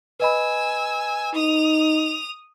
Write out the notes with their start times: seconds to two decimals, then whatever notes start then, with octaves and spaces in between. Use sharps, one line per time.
0.20 B4 D#5 G#5 B5 E6
1.35 D#4 D#6 F7